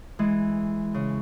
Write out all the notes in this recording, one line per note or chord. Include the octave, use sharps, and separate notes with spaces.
E3 G#3
C#3